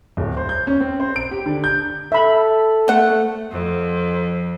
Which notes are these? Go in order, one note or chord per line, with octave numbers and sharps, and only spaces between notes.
D1
C5
G6
C#4
C4
C5
D7
G4
D3
G6
A4 E5 B5
A3 C5 F#5
F2